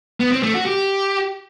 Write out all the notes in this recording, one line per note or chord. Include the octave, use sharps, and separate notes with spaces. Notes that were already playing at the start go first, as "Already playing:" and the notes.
B3
C4
A3
F#4
G4